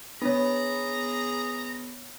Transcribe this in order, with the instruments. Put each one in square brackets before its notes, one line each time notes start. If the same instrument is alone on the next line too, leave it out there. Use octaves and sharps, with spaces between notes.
[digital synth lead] B3 [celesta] D4 C#5 [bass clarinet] G#4 [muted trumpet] A#5